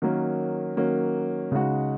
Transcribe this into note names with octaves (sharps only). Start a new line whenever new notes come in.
D#3 F#3 A#3 C#4
D#3 F#3 A#3 C#4
C#3 G#3 D#4 F#4